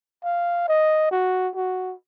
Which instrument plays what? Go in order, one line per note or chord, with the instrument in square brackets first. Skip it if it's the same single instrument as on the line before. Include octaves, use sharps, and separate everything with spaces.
[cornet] F5
D#5
F#4
F#4